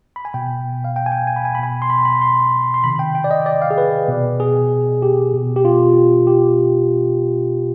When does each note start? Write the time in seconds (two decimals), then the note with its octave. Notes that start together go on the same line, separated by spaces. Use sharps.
0.16 B5
0.25 G#5
0.34 B2 G5
0.84 F5
0.96 G5
1.06 G#5
1.12 G5
1.27 G#5
1.36 B5
1.45 G#5
1.55 B5
1.59 B2 G#5
1.82 C6
1.90 B5
2.05 B5
2.21 C6
2.74 C6
2.84 C3 D#3 B5
2.99 G5
3.15 G5
3.24 D5
3.31 D#5
3.46 D5
3.62 F5
3.70 G#4
3.78 B4
4.08 B2
4.40 G#4
5.02 G4
5.33 B2
5.56 G4
5.65 F4
6.27 G4